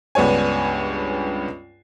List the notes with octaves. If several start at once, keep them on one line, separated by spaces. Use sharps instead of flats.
C#2 G2 B3 D4 C#5 G#5